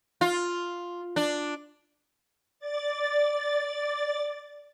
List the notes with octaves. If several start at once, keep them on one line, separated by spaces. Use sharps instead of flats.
F4
D4
D5 A6